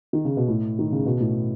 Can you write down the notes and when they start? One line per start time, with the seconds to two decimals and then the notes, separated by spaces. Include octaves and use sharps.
0.13 D#3
0.25 C#3
0.37 B2
0.48 A2
0.79 D#3
0.92 C#3
1.06 B2
1.20 A2